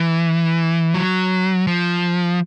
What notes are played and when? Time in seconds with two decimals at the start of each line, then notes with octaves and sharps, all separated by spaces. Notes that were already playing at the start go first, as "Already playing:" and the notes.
Already playing: E3
0.94 F#3
1.67 F3